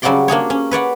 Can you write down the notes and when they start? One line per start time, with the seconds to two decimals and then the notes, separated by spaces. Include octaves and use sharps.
0.02 C#3 F#3 G3 F#4 D5 C6
0.28 A#3 D4 G#4 C#5
0.50 C#4
0.71 B4 C#5 D5 F#5